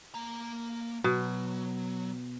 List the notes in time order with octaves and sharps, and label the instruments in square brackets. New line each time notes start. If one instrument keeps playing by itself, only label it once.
[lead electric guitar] A#3 A#5
[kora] B2 [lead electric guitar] F#3